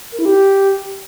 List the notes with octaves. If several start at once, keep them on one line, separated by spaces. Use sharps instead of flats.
A#4
E4
G4